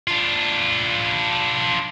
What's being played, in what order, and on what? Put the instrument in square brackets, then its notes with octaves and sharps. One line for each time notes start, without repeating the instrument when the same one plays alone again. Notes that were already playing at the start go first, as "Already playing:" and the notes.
[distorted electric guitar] D4 F4